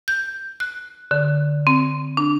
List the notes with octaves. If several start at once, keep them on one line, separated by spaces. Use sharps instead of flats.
G6
F#6
D3
C4
D4